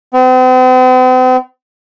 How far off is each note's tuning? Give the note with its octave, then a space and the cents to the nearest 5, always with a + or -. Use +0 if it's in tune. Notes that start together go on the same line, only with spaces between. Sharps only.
C4 -45